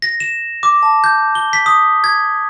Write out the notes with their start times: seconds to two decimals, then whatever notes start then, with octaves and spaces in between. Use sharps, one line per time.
0.02 A#6
0.20 E7
0.63 D6
0.83 A5
1.04 G6
1.35 G7
1.53 B6
1.66 D#6
2.04 G#6